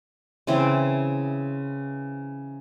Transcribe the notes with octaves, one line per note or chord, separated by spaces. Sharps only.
C#3 E3 C4